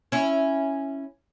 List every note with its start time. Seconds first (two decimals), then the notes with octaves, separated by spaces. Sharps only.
0.12 C#4 E4